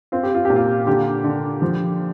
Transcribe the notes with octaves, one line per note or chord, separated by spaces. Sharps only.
C4 F4
G4
F4
A#2 G4
F4
D3 G4
D3
F3